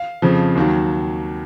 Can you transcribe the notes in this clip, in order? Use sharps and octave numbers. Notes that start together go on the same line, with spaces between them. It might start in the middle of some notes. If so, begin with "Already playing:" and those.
Already playing: F5
F2 C#3 F3
D#2 D#3 F#3